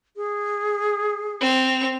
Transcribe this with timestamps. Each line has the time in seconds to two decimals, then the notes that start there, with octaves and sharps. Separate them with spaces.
0.17 G#4
1.40 C4 F7